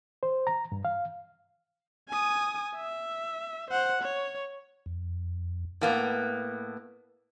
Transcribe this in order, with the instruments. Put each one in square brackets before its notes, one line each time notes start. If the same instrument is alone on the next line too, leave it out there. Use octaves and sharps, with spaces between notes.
[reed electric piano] C5
A#5
G2
F5
[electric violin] G#5 D#6
E5
C5 F#5
C#5
[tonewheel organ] F2
[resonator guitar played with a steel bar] A2 A#3 B3